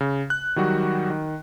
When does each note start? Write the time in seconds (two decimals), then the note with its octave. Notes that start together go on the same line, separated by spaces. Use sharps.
0.01 C#3
0.30 F#6
0.56 D#3 F#3 G3 F#4
1.10 D#3